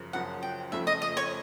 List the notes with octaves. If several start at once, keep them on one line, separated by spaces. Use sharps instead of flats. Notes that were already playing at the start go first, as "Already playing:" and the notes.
Already playing: F#2 C#3 F3
F#2 C#3 F3 F#5
G5
F2 C#3 F3 A3 E5
D#5
D#5
C#5